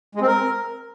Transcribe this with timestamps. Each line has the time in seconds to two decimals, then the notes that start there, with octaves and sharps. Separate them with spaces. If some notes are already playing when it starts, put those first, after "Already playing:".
0.15 G#3
0.21 C4
0.27 A#4